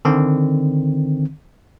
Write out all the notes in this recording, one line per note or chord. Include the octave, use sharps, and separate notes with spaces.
D3 D#3 C4